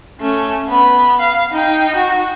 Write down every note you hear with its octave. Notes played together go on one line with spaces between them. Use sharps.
A3 C#4
B3 B5
F5
D#4 G5
F#4